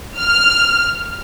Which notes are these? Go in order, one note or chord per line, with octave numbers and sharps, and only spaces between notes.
F6